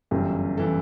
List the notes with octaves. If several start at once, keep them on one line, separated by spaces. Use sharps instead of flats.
G1 F#2 E3 G4
E3 A4